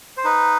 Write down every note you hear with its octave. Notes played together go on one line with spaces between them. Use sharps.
C5
D#4 B4